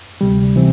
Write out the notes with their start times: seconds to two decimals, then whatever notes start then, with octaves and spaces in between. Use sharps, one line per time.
0.21 D2 C3 G3
0.56 C3 E3 C4